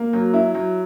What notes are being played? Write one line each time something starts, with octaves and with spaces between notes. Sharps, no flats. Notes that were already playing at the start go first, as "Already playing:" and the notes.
Already playing: A#3
F#3
E4
F#3